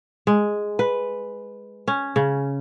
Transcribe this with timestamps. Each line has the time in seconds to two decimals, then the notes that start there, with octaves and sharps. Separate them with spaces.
0.27 G#3
0.79 B4
1.88 C#4
2.16 C#3